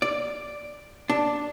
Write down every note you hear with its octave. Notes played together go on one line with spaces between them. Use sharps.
D5
D4